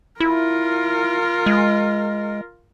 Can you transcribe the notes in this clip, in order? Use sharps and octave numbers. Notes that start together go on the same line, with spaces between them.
E4 F4 A#4
G#3